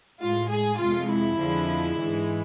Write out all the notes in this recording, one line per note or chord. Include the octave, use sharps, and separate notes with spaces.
A2 G#3 F4
G#4
F2 C3 G#3 F4
E4
F2 D3 F3 G#3
G#2 E3 G#3